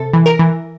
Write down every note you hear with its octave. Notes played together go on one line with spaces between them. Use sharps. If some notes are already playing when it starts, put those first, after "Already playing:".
Already playing: C3 A4
E3
A#4
E3